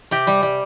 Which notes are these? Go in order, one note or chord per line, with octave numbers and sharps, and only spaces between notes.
C3 G4
G3
G3